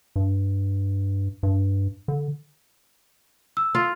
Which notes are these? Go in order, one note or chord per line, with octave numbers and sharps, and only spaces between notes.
G2
G2
D3
E6
F4